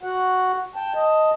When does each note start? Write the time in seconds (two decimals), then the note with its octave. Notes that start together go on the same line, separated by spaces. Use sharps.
0.03 F#4 F#5
0.76 G5 A5
0.95 D#5 A5